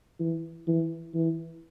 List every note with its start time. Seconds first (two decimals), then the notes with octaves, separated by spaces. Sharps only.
0.20 E3
0.67 E3
1.14 E3